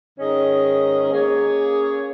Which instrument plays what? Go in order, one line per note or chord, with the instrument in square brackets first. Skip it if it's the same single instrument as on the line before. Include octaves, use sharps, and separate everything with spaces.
[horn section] G#2 D#3 C#4 G#4 D#5
A#3 C#4 G#4 C#5